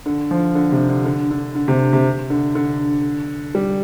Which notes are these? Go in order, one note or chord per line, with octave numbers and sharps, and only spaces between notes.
D3
F3
D3
C3
D3
D3
D3
D3
C3
C3
D3
D3
G3